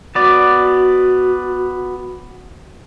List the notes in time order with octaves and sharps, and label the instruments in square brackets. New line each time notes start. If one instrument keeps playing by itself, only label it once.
[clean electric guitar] B3 D5 [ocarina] F#4